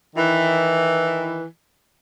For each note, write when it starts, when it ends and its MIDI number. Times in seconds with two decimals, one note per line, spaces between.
0.15 1.43 51
0.15 1.43 52